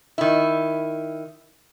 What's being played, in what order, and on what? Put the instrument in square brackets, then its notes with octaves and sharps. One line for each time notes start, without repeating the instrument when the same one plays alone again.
[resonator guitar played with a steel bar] D#3 E4